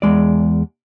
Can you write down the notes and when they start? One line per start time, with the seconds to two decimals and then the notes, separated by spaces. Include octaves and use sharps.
0.02 E2 G#3 D5